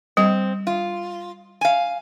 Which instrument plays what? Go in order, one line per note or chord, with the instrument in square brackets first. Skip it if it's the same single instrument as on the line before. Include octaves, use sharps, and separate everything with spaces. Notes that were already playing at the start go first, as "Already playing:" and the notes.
[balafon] G3 [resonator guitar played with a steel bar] C4
[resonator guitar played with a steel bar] F4
F5 G#5